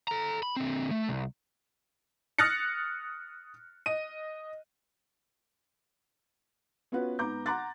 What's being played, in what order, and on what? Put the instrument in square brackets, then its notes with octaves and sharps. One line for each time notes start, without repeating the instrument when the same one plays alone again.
[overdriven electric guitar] A4 A#5
B5
D3 C4
A3
C2
[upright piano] D#6 F6 F#6 A6 A#6 C#7
D#5 D#7
[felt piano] B3 C#4 F4 F#4 B4
G#2 B3 A#5 D6 G6
F#5 A#5 C6 D6 F#6 A6